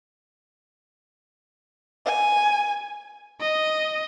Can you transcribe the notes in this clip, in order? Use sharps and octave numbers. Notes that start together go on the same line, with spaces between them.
G#5
D#5